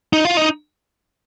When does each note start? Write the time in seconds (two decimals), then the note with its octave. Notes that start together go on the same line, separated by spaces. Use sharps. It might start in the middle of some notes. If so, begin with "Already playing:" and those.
0.13 D#4
0.25 F4
0.37 D#4